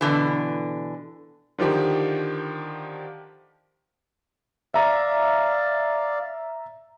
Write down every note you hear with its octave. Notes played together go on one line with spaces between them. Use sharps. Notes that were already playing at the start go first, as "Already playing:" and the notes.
B2 D3 E3
D3 D#3 F3 G4
D5 E5 F5 A#5